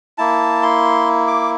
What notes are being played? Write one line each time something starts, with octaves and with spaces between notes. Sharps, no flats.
A#3 E4 A5
C6
D6